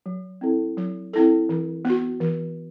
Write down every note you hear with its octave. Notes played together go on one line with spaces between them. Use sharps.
F#3
C4 E4 A4
F#3
C4 E4 A4
E3
B3 F#4
E3